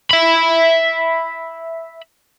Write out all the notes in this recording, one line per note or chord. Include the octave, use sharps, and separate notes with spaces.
E5 B5